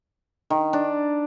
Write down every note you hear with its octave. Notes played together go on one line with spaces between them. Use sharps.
D#3
D4